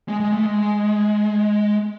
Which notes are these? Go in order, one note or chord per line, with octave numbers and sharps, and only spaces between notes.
G#3
G#3
A3
G#3